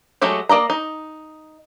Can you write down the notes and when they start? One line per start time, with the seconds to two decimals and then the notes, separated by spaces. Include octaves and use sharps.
0.22 F#3 G#3 A3 F#4 G4
0.49 A#3 D5 D#5 A#5
0.70 D#4